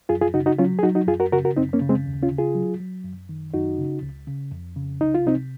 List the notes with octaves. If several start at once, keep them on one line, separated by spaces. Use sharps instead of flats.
F#2 F4 G#4
F4 G#4
C#3 D#4 F#4
D#4 F#4
F#3 C#4 F4
G#4
F#3 D#4 F#4
D#4 F#4
F#2 F4 G#4
F#4 A#4
C#3 F#4 A#4
F#4 A#4
F#2 C4 D#4
A#3 C#4
C#3
G#3 C4
D#2
C#4 F4
C#3
F4 G#4
F#3
F#3
F#2
D#3
F#2 D#4 F#4
C#3
C#2
C#3
F2
C#3
C2 D#4
F4
C3 C4 D#4